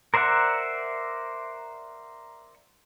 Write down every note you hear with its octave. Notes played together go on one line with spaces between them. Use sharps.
A#4 C5 D5 E5 F#5